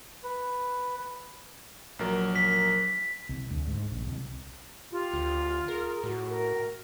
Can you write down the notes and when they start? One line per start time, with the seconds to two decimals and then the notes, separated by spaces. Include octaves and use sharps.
0.24 B4
1.99 A#1 F#3 A#4
2.36 B6
3.29 C2
3.50 D2
3.67 G#2
3.92 A#1
4.07 C2
4.92 F4 G4
5.13 D2
5.68 G#4 A#4
6.04 A2 F#4
6.29 A#4